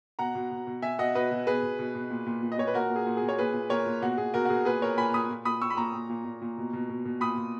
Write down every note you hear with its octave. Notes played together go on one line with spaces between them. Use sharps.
B2 F#5 A#5
B2
B2
B2
B2 E5 G#5
B2 D#5 F#5
B2 B4 D#5
B2
B2 G#4 B4
B2
B2
B2
A#2
A#2
A#2
D#5
A#2 C#5
B4
A#2 F#4 A#4
A#2
G#4
A#2
G#4
A#2
C#5
A#2 G#4 B4
A#2
A#2 A#4 C#5
A#2
B2 F#4
B2 G#4
B2 F#4 A#4
F#4
B2 G#4
A#2 G#4 B4
A#2 A#4 C#5
A#2 G#5 B5
A#2 B5 D#6
A#2
A#2 B5 D#6
A#2 C#6 E6
B5
A#2 A#5 C#6
A#2
A#2
A#2
A#2
B2
B2
B2
B2
A#2 B5 D#6
A#2